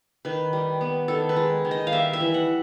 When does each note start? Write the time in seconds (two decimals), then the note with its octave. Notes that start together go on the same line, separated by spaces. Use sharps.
0.25 D#3 B4
0.53 G3
0.81 B3
1.08 D#3 A4
1.29 B4
1.36 G#3
1.65 D#3
1.71 D#5
1.87 F5
1.92 G3 E5
2.13 E5
2.20 E3
2.34 F#5